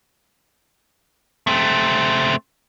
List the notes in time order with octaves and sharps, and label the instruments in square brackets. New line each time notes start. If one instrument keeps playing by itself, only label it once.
[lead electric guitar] A3 C4